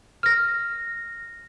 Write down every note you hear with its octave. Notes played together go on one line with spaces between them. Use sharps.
F6 A#6